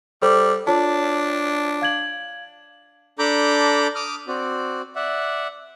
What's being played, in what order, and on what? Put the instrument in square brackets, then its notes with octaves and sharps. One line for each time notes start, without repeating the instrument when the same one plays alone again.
[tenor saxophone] G3 [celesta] A4 C5 D6
[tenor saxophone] D4 [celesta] F4 C#5 A5
[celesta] F5 G#6 F#7
[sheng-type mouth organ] D4 A4 A#5 B5 D6 G6
D6 D#6 F6
C4 F#4 D5
D5 E5 F#5